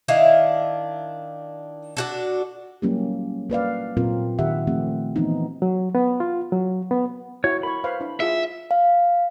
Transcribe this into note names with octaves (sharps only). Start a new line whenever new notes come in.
D#3 D4 E4 F5
D4 F#4 A4
F#3 G3 A#3 C#4 E4 G4
A#3 B4 D5 F5
A#2 F#3 C4 F4 A#4
D#3 G4 E5 F#5
F3 A3 C4 G4
E3 F3 B3 C4 D#4
F#3
B3
F4
F#3
B3
E4 F#4 C#5
A#4 B5 C#6
B4 C5 F5
D4 E4 C5
F4 G#4 E5 E6
F5